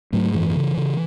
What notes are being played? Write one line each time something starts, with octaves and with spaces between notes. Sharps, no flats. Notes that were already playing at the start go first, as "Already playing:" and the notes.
G#2 F#3 A3
F#2 E3
C#3
C#3